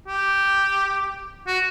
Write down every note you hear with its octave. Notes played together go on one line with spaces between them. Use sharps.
G4
F#4